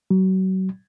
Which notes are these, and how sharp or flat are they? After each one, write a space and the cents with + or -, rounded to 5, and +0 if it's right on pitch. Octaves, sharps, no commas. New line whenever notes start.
F#3 +30